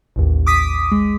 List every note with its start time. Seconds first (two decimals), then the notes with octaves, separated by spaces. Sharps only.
0.16 A1 D#2
0.47 D6 D#6 B6
0.92 G#3